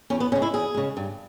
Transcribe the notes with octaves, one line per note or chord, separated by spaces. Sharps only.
E2 C#4
B3
C#3 G#3 C#4
E4
E2 G#4
C#3 G#3
G2